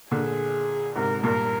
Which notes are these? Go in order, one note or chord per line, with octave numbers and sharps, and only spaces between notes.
A#2 D3 G#4
G#2 C3 A#4
G2 A#2 A#4